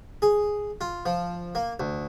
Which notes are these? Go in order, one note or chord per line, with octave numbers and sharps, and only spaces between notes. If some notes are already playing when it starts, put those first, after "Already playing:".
G#4
F4
F3
A#3
D2